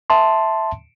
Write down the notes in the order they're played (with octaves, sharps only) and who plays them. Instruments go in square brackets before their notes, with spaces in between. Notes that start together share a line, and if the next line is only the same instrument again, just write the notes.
[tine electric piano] E5 A5 C6